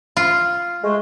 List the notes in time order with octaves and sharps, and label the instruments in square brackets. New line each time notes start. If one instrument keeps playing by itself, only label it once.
[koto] F4
[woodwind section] G#3 A3